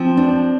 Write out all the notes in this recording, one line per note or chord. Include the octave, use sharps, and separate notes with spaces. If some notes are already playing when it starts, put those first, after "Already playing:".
Already playing: F3 C4
D4